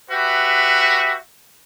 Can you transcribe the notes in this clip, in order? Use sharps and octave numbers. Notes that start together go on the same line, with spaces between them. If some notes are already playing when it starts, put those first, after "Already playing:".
F#4 G4 B4 E5